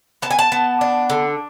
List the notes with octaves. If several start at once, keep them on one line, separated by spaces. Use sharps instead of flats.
B3 A5
G#5
A5
B3
D4
D3